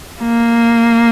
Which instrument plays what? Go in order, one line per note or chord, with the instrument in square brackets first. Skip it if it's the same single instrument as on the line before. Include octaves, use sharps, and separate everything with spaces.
[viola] A#3